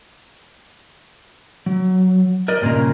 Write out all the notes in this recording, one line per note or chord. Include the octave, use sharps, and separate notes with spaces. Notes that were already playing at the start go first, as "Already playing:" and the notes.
F#3
A#4 D5 D#5
G2 A#2 C#3 A#4